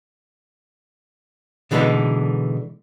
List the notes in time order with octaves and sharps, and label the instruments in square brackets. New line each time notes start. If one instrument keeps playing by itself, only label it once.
[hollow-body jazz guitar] B2 D3 E3 G#3 B3 D#4